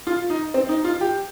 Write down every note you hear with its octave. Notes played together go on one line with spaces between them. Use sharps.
F4
D#4
C4
D#4
F4
G4